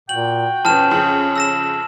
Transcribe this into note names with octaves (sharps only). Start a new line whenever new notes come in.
A#2 F#4 G5 F#7
F2 B2 C#4 A5 F6 E7
F2 C#3 F#7
E6 A#6 E7